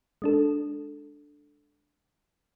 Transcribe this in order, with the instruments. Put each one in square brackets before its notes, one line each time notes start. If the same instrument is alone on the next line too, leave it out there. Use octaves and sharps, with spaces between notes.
[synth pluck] G#3 D4 A4